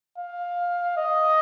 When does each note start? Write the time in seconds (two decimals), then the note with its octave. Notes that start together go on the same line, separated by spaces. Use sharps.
0.18 F5
0.97 D#5